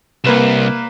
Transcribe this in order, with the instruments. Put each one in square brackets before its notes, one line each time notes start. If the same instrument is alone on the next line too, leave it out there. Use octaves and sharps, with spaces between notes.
[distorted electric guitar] C2 [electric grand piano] A#3 B4 E7